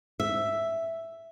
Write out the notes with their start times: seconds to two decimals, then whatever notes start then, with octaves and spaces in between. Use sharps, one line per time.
0.20 E5